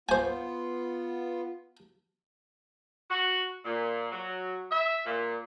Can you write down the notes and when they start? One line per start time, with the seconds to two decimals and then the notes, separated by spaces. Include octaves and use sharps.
0.09 B3 F4 C5 G#5
3.09 F#4
3.64 A#2
4.12 F#3
4.70 E5
5.05 A#2